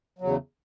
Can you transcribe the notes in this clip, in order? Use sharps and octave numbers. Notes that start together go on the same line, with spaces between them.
E2 C#3 F#3